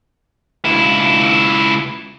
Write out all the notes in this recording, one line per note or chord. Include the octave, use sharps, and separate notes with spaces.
C#2 E4